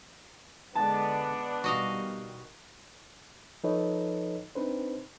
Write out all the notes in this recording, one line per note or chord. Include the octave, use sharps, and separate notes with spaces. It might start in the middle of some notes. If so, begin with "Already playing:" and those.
D3 G#3 B3 D4 A5
B2 D#3 G3 F#4 D#5 F5
F3 D#4 A4 B4 C#5 D#5
C4 D4 D#4 B4 C5